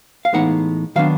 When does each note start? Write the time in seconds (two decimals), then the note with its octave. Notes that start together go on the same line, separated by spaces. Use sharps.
0.25 F5
0.33 A2 E3 G#3 B3 D#4 F#5
0.96 D#3 F#3 B3 D4 F5